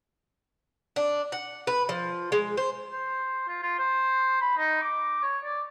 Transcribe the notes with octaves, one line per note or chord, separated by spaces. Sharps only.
D4
F#5
B4
F3
G#3
C5
C5
F4
F4
C5
B5
D#4
D6
C#5
D5